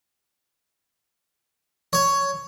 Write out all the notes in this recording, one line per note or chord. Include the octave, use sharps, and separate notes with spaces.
C#5